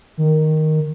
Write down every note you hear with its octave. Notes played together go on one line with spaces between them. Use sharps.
D#3